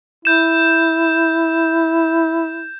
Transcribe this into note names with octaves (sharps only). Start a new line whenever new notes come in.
E4 G6 E7